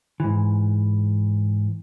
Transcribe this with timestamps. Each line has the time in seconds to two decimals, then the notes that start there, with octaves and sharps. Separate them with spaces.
0.20 G#2 E3